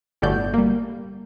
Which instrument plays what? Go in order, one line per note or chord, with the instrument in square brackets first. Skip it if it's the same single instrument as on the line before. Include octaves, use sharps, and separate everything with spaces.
[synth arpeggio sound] G1 A2 A3 F#4 D5 G6
G3 A#3